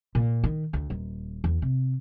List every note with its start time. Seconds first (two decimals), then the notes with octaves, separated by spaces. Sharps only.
0.15 A#2
0.44 D#3
0.73 D2
0.90 D#1
1.44 E2
1.62 C3